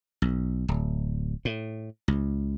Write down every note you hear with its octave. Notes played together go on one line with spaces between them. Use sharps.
B1
D1
A2
C#2